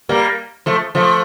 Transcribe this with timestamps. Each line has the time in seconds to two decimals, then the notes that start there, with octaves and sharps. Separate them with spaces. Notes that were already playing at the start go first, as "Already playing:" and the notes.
0.09 G3 A#3
0.66 F3 A3
0.95 F3 A3